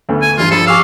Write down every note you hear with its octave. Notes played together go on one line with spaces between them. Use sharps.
D2 A3 B3
G#5
G2 E3 F4
G2 F3 A4 B5
G4 F5 G#5 C#6 D6 E6